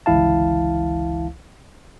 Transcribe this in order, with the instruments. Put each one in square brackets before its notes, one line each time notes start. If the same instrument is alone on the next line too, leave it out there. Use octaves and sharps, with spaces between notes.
[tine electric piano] G1 C#2 E3 E4 F5 A5